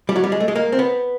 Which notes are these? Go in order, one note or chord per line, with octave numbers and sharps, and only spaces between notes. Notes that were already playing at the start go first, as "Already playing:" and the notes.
G3
F#3
G3
G#3
A3
G#3
A#3
C4
B3